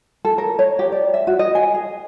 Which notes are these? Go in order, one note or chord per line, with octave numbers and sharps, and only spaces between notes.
A4
A#4
C#5
G4
D5
E5
F#4
D#5
G#5
G#4